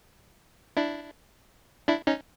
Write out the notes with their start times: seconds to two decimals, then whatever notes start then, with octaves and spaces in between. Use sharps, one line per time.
0.77 D4 E4
1.88 D4 E4
2.07 C#4 D#4